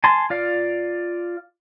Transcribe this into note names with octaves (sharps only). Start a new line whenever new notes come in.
G#5 A5 C6
F4 D5 F5